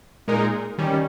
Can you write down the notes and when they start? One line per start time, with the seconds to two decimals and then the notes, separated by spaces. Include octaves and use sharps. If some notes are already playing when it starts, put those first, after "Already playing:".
0.28 A#2 G#3 D#4 A#4
0.78 D#3 G3 C#4